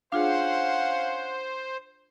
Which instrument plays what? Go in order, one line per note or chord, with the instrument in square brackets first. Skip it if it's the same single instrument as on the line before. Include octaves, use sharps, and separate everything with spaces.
[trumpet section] C#4 F#5 [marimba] D4 F4 G#4 [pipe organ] C5 [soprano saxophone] F5